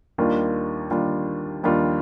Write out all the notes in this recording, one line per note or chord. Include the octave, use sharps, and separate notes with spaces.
D#2 D#3 G3 D4 F4
D#2 D#3 G3 D4 F4
D#2 D#3 G3 D4 F4